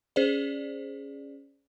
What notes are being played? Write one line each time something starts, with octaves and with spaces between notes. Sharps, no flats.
C#4 G#4 C5 D5